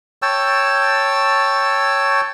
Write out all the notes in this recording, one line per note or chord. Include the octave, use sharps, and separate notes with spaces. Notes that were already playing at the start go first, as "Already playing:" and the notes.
C#5 G5 A5 E6